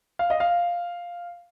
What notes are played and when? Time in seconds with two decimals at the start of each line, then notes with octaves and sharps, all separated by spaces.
0.19 F5
0.30 D#5
0.40 F5